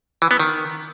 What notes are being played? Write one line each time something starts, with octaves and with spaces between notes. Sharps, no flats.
E3
B3
D#3